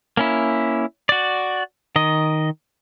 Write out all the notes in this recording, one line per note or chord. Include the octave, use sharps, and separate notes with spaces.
A#3 C#4 E4
F#4 D5
D#3 D#5